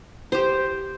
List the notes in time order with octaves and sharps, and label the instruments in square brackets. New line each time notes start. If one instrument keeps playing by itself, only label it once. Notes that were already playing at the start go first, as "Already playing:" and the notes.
[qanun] G4 C5